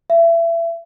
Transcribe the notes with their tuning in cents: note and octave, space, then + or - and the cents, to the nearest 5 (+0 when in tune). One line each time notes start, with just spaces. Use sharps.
E5 +30